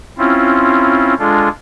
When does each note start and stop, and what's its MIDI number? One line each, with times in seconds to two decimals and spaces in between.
0.18 1.14 60
0.18 1.14 61
0.18 1.14 64
0.18 1.14 65
1.19 1.49 56
1.19 1.49 62
1.19 1.49 65
1.19 1.49 69